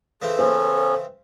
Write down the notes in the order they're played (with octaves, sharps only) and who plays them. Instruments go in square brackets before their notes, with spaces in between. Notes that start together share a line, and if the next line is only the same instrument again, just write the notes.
[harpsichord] C#3 E3 C4 [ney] A4
[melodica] B3 C#4 [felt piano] C5